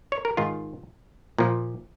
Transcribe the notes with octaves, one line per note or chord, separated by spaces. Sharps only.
C#5
A#4
G#2 D#3 F4
A#2 F3